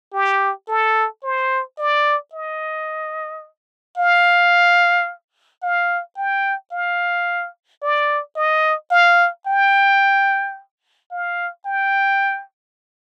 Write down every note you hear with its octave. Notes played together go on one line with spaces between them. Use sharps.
G4
A4
C5
D5
D#5
F5
F5
G5
F5
D5
D#5
F5
G5
F5
G5